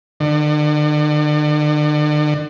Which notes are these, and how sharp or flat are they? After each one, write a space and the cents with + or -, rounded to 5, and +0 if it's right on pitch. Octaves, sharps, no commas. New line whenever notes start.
D3 +40